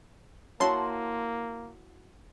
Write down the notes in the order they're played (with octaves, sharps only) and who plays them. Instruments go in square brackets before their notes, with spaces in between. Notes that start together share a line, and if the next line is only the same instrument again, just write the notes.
[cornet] A#3 [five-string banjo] E4 F#4 C#5 [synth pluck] A5 C6